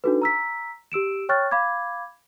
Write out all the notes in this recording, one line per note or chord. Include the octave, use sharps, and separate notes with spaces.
D4 D#4 F#4 A4 B4
A#5 E6 B6
G4 E6 D7 E7
C#5 G5 C#6 F6 F#6 A6
F5 B5 D6 G#6